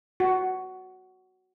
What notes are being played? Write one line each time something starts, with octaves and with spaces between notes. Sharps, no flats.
F#4